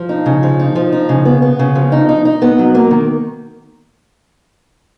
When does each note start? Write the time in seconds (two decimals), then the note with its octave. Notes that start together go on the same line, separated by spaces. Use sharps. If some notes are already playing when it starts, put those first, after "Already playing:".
Already playing: F3
0.09 D#4
0.26 C#3
0.43 F3
0.60 D#4
0.76 F3
0.92 D#4
1.09 C#3
1.25 B3
1.42 B3
1.59 C#3
1.75 F3
1.92 D#4
2.09 D#4
2.25 D#4
2.42 B3
2.59 F#3
2.75 A#3
2.91 D#3